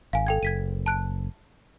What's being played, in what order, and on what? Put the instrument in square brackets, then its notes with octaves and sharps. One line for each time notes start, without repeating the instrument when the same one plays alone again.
[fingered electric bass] G#1 [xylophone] F5 G#5
[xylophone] A4 G5 G#6
[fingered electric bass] F#1 [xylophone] G#6 B6 D#7
[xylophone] A5 F#6 D7